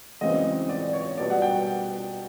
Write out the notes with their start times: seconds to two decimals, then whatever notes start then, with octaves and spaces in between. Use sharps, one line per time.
0.21 F#2 C#3 E3 G#3 C4 D#5
0.69 D5
0.93 C#5
1.18 B2 G3 B3 D5
1.30 F#5
1.42 G5